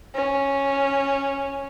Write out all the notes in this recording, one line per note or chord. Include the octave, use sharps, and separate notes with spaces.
C#4